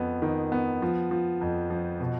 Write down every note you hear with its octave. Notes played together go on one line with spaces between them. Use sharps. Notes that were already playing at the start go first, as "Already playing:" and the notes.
Already playing: F2 B3
D#3
B3
F3
F3
F2
F3
B2